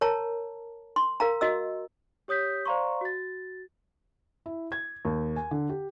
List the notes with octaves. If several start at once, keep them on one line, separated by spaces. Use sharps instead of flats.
A#4 C#5 A5 A#5
C6
A#4 F5 A#5
F#4 D#5 E6
G4 C#5 D#6 G6 B6
C5 D5 F5 A#5 C6 C#6
F#4 A6
E4
G#6
D#2
G#5
D3
G4